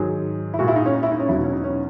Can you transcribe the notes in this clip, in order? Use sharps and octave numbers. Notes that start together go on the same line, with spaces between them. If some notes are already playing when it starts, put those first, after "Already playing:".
Already playing: G#2 D#3 F#3 G#4
E4
A#2 G#3 F#4
E4
D#4
C#4
D#4
E4
D#4
C#4
E2 B2 F#3 E4
D#4
C#4
D#4
C#4